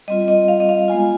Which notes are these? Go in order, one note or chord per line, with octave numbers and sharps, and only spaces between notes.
G3 C4 F4 D#5
D#5
F5
D#5
F5
G#3 B3 F4 G#5